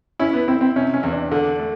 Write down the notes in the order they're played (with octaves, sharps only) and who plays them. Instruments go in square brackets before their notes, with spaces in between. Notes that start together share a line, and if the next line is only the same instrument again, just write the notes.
[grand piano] C#4 [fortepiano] E4
[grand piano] B3
[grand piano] C4 [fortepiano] E4
[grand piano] C4
[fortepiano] C3 [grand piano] C#4
[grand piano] C#4
[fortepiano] E2
[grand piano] D4
[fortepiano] D3
A3